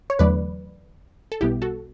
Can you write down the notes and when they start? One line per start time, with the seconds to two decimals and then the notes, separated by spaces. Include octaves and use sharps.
0.10 C#5
0.19 E2 D3 F#3 A3 B4 D5
1.32 A4
1.41 B1 B2 G3 B3 E4 G4
1.62 F#4 A4